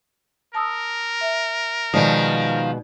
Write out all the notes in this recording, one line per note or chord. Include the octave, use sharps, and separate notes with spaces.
A#4 A5 D#6 E6
E5
B2 D#3 F3 G#3 D#4 D5 A5